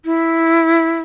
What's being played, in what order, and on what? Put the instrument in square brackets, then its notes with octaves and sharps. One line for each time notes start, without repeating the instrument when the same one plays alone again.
[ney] E4